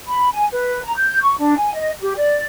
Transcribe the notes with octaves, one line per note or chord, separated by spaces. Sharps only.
B5
G#5
B4
A#5
G6
C#6
D4
G#5
D#5
G4
D5